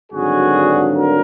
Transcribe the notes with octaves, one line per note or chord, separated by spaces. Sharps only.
G#1 G2 D3 F#3 F#4 G#4
A#4